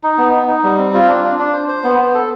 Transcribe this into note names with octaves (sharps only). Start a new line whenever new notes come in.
D#4
B3
D#4
D#4
G3
C4
F4
D4
D4
D4
C5
C5
B3
B3
A4